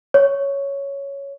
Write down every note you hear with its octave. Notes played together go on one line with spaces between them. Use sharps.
C#5